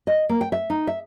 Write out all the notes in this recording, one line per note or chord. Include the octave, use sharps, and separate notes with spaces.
D#5
A#3
G5
E5
D#4
E5